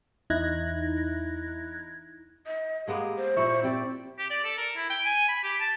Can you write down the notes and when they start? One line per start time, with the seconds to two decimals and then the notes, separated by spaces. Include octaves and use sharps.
0.30 E2 D#4 E4 F#6 G#6 A#6
2.47 D#5
2.88 G#3 A#3 B3 G4 G#4
3.17 C5
3.36 A#2 E4 E5 C#6
3.63 C4 E4 G4 D5
4.19 G4
4.30 D5
4.44 A4
4.58 A#4
4.77 E4
4.90 G5
5.05 G#5
5.29 B5
5.44 G4
5.60 A5